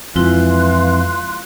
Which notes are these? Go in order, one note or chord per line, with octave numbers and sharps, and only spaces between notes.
F2 E3 G#3 E4 F4 F5 C6 F#6